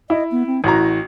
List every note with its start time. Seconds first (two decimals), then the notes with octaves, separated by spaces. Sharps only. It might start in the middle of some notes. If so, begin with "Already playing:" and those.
0.10 E4 D#5
0.31 B3
0.47 C4
0.64 A1 E4 F#4 A#5